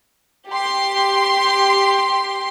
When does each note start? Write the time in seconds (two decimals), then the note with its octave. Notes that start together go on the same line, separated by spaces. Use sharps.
0.48 G4 C6